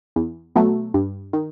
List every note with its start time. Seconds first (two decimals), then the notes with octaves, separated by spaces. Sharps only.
0.16 E2
0.55 B2 F#3 A3
0.94 G2
1.33 D#3